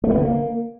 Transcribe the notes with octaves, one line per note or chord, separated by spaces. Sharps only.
A3
B3
D3
A#3